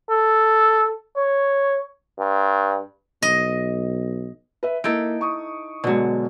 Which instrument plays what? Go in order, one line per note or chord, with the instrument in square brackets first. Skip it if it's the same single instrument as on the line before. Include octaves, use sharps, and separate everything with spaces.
[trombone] A4
C#5
G2
[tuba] B1 [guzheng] D#5
[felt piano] B4 E5
[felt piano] A#3 D7 [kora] D#4 E4 A4
[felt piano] C#6 D#6
[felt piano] B2 G#3 [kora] D3 F#3